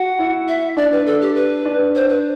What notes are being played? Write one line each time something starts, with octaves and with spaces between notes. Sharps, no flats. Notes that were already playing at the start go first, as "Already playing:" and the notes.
Already playing: F#4 F#5
E4
E5
D4 D5
B4
A4
G4
B4
D4
C5
B4